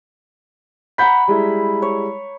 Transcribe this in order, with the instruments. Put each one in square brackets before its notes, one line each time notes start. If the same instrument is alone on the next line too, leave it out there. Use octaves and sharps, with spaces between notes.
[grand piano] F#5 G6 B6 [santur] A#5 B5
[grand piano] G3 G#3 E4
[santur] C#5